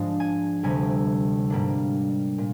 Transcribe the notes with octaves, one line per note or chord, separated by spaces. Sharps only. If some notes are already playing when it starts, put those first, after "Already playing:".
Already playing: G#2 F3 G#3 D4
G#5
D2 C3 G3 G#5
G#2 G3 A#3 D4
A#2